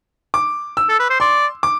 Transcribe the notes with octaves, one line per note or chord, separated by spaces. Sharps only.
D6
E6
A4
B4
C5
D5 C6
D6